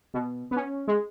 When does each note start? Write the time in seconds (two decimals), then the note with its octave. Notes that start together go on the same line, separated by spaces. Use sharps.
0.14 B2
0.51 B3
0.56 C#4
0.88 G#3